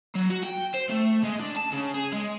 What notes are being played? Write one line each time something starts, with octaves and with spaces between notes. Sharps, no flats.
F#3
F#4
G5
C5
A3
G#3
D4
A5
C#3
G#4
G#3